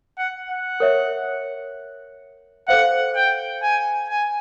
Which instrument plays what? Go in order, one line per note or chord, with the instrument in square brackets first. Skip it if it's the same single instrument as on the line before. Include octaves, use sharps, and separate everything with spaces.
[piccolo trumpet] F#5
F#5
[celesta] A#4 C#5 E5
[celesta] A4 C5 F5 [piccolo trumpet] F#5
[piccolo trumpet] G5
G#5
G#5